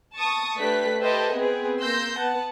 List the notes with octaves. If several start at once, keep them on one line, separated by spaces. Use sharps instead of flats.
A5 C#6 D#6
A3 D4 G4 B4 F#6 B6
G4 A4 B4 C5 D#5 E5
B3 C4 G#4 B4
A#3 C6 E6 G6 A#6
B3 F#5 A5